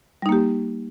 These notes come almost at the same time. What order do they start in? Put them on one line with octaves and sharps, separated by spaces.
G3 D#4 A#3 G4